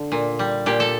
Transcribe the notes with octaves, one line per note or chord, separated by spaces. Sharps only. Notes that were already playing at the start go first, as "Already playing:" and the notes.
Already playing: D3
A#2
G3
A#2 G4
A4